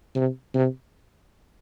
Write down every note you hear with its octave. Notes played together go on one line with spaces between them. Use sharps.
C3
C3